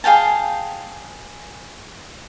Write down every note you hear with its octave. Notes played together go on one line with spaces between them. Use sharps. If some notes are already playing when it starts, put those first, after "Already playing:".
G#4 F5 G5 A5